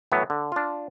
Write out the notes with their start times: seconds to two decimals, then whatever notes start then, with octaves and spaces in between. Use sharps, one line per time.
0.12 A2 E3 F#3 B3
0.30 D3
0.52 D4 F4